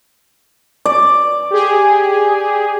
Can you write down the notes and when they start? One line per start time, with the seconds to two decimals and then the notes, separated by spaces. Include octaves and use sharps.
0.86 D5
1.51 G4 G#4